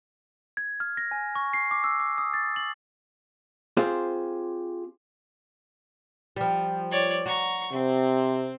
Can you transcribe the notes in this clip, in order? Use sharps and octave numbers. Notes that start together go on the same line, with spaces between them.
G#6
F6
A#6
G#5
C#6
C7
D6
E6
D6
D#6
A6
F#7
C4 F4 G4 G#4 C5
F3 G3
C#5 D5
F#4 A#5 C#6
C3 C4